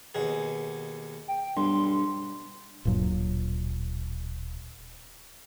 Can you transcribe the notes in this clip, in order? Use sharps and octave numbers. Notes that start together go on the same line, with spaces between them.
D#2 B2 G#4
G5
B1 G2 C6
D1 G2 A#2 F#3